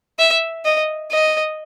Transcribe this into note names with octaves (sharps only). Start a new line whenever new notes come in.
E5
D#5
D#5